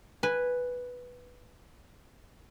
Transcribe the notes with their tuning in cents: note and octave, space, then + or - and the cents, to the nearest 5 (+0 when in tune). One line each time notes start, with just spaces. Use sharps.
B4 +0 G#5 -10